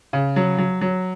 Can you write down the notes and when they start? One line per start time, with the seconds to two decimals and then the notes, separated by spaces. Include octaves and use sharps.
0.13 C#3
0.36 F#3
0.58 F#3
0.81 F#3